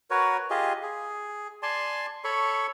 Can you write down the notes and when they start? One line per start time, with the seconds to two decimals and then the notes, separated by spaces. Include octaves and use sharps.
0.10 F#4 A#4 B4 C#5
0.50 F4 G4 G#4 D#5
0.83 G#4
1.63 D5 G#5 A5 C6
2.24 A4 C#5 B5 C#6